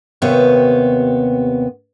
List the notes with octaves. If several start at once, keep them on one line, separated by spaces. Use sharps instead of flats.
D#2 C3 B3 C#5